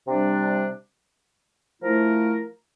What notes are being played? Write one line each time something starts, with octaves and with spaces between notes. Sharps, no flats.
C3 G3 D4
F3 A3 E4 A#4